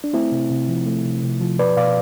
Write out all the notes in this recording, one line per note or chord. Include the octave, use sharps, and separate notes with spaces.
D4
A3 C4 E4
C3
C3
F3
A3
C3
C3
F3
B2 B4 D5
B2 D5 F5